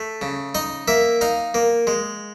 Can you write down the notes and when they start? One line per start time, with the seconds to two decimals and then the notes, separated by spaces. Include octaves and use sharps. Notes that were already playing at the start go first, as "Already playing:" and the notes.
Already playing: A3
0.22 C#3
0.55 D#4 D#5
0.88 A#3 E5
1.21 D#4 F5
1.54 A#3
1.87 G#3